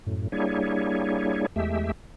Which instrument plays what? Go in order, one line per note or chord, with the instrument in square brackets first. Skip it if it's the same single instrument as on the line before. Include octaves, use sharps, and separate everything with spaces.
[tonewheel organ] F#2 A2
G3 A#3 D4 E4 G#4 C#5
E2 G#3 A3 G4 E5